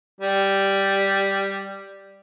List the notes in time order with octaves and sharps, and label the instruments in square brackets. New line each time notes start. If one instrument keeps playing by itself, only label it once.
[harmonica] G3